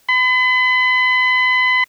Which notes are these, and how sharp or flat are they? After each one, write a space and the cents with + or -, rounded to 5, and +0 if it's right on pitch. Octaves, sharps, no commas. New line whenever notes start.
B5 +40